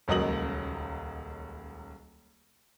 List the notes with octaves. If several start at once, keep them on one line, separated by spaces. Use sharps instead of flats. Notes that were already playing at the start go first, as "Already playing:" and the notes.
D#1 C#2 F#3 A#3 D#5 F#7